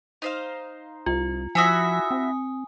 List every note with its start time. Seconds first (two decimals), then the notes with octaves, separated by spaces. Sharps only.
0.22 D#4 C5 F5
1.06 C2 F4
1.55 F3 E4 F#4 E5 G#5 D#6
2.11 C4